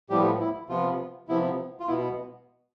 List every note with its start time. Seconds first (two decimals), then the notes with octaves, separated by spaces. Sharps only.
0.10 A2 F3 G3 B3 G4
0.40 E4
0.69 C3 F3 B3 F4
1.28 C3 F3 B3 E4
1.80 F4
1.88 B2 B3 E4